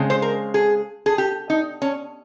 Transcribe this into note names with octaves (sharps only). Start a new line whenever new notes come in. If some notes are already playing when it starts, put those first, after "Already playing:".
Already playing: C#3 G#3 C4
C5
A#4
G#4
G#4
G4
D#4
C#4